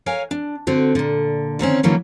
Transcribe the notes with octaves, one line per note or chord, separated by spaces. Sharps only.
A#4 C#5 F5 G#5
D4
D3 C4 F#4
A#2 D3
D3 D#3 C4 C#4
D3 E3 F#3 A#3 C#4